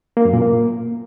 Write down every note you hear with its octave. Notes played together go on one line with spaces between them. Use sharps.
A#3
F#2
A#2
A#3